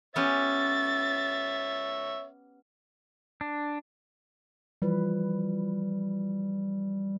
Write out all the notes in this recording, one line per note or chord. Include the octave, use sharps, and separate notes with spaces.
B3 C#4 G4 C#5 E5 A6
D4
E3 F3 G3 B4